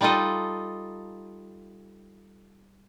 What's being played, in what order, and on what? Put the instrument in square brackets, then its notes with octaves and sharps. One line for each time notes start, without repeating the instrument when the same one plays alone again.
[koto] G3 D#4 F4 A4 D#5